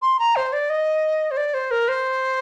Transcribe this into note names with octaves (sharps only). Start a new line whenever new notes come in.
C6
A#5
C5
D5
D#5
C5
D5
C5
A#4
C5